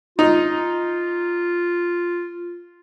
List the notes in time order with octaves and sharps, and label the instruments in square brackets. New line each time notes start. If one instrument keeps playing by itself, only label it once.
[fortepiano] D#4 [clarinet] F4